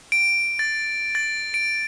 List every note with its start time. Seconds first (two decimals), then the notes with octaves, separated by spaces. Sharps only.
0.12 D7
0.59 A6
1.15 A6
1.54 D7